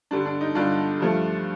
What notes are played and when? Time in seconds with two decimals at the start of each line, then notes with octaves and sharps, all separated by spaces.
0.11 G2 D3 G3 D4
0.25 D4
0.41 D#4
0.55 G2 D3 G3 D4 F4
1.00 G2 F3 A3